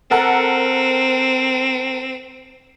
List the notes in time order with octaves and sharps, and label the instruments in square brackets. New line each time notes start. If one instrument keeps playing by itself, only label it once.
[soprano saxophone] C4 [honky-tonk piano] A4 A#4 F#5